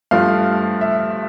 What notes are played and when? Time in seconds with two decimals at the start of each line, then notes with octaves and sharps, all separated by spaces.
0.11 G2 F3 A3 F5
0.81 E5